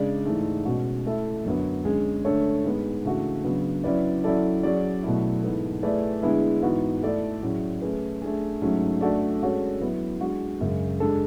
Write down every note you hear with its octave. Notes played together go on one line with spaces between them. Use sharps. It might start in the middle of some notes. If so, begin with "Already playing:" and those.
Already playing: C#3 G#3 D4 G#4 D5
G#2 E3 A3
B2 G#3 C#4 F#4
A3 E4 A4 E5
F#2 D3 F#3 B3
D3 G#3 C#4 G#4
D3 A3 D4 A4 C#5
G#2 G#3 B3
C#3 E3 A3 D4 F#4
C#3 F#3 B3 D4
F#3 C#4 E4 B4 D5
F#3 C#4 E4 A4 D5
F#3 C#4 G#4 D5
B2 F#3 A3 E4
G#2 E3 B3 E4 A4
A3 E4 G#4 B4 D5
D3 G#3 B3 E4 G#4
G#2 E3 B3 F#4
A3 E4 A4 D5
A2 F#3 C#4 G#4
A3 C#4 G#4 B4
A3 D4 G#4
G#2 F#3 A3 C#4
A3 D4 F#4 A4 D5
G#3 C#4 F#4 A4 C#5
F#3 B3 E4
G#3 D4 F#4
F#2 C#3 G#3
G#3 D4 A4